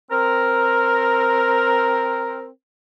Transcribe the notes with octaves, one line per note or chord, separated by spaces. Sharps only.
C4 A#4